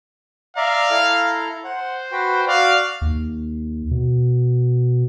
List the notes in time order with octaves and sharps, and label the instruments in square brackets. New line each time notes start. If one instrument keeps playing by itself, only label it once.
[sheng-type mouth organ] D5 E5 A#5 [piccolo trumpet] F5
[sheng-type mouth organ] E4 A4 A#5
[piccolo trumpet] C5 [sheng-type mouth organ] F#5
[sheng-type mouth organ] F#4 B4 G5
[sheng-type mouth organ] F#4 D5 [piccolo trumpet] F5
[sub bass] D#2
B2